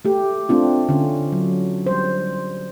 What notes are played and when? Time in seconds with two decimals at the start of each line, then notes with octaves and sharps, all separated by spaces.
0.05 A3 G4
0.49 A3 C4 D4 F4
0.89 D3 C#4
1.32 F#3
1.86 G3 C5